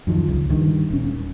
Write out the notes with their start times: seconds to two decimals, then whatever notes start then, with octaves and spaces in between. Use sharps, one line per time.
0.07 F#2 D#3 F3
0.28 C#2
0.50 G2 D#3
0.90 D#1 C#4